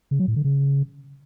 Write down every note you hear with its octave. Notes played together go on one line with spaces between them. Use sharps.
C#3
F#3
A2
D3
C#3